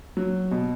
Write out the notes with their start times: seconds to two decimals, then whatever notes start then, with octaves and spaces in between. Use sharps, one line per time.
0.17 F#3
0.51 B2